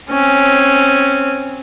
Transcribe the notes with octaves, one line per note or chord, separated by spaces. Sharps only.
C4 C#4